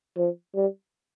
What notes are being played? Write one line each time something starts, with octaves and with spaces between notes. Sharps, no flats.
F3
G3